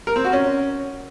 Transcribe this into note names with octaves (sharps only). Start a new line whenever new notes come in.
A#4
C4
F#4
C#4